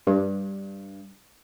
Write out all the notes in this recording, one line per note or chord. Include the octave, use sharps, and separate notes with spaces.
G2